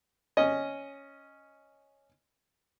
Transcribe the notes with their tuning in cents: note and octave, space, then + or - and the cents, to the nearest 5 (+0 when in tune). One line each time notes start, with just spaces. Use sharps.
C#4 +0 D#5 +0